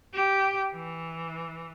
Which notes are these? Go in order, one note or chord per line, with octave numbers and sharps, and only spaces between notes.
G4
E3